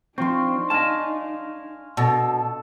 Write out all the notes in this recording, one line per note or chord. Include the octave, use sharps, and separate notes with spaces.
F3 C4 D4 D#4 C6 C#6
D#5 F5 G#5 A5
B2 D4 A4